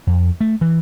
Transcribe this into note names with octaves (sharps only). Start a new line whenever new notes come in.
F2
A3
E3